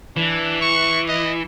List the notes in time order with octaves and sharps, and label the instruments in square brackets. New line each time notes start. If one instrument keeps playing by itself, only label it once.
[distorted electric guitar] E3 [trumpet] D4
[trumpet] C#6
D#5